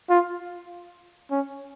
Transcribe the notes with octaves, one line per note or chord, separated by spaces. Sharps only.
F4
C#4